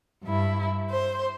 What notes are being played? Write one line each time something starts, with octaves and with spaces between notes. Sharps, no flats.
G2 E4
C5